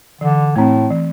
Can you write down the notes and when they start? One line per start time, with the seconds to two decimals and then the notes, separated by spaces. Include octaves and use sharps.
0.21 D3 E3
0.56 A2 A3 C4
0.90 E3